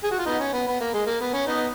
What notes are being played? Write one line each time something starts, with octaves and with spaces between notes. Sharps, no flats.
G#4
F#4
F4
B3 D#4
C#4
B3
B3
A#3
G#3
A#3
B3
C#4
B3 D#4